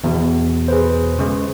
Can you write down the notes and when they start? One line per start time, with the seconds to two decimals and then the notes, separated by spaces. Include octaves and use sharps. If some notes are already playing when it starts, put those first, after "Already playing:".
0.04 E2 B2
0.68 G#4 B4 C5
1.19 C#3 G#3